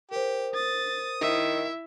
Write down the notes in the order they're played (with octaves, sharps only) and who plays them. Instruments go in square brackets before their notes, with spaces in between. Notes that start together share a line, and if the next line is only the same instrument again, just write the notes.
[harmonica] G4 [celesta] A#4 C5
[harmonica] D#6 [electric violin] A6
[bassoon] D#3 [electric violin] E4 E5